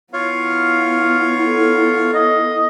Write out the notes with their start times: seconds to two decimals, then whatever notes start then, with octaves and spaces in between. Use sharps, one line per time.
0.13 B3 E4 F4 C#5 F5
1.45 A4
2.14 D#5